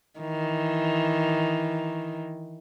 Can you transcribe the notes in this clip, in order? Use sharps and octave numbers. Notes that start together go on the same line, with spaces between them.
D#3 E3